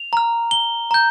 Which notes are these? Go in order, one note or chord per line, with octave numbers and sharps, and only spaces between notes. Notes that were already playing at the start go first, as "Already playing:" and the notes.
Already playing: F7
A#5 F6
G7
A#5 G6